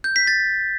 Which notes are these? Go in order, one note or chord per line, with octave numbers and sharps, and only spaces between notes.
G6
B6
A6